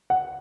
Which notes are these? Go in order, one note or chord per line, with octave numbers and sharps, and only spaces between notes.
F#5